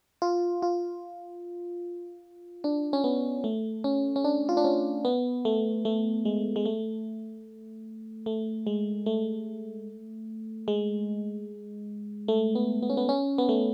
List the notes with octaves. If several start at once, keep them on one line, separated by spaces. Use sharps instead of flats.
F4
F4
D4
C#4
B3
A3
C#4
C#4
D4
F4
D4
C#4
B3
A3
A3
G#3
G#3
A3
A3
G#3
A3
G#3
A3
B3
B3
C#4
B3
C#4
B3
A3